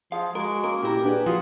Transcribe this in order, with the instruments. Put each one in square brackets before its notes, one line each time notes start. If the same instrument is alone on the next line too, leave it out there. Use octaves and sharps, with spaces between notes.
[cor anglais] F3 [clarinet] G#4 [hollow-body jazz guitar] F5
[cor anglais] G#3 [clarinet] F#4 [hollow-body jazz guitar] A#4
[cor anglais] A#3 [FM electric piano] C#4 [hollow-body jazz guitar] A#4
[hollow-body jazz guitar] A#2 A#4 [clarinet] E4 [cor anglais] G4
[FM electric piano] D4 F#4 G#4 [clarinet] B4
[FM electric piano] F3 D#6 [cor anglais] F4 [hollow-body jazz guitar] F#4